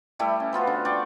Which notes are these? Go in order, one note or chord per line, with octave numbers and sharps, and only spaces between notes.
G3 A3 E4 G4
C#4
F3 B3 F4 F#4
D3
D5 G5 C#6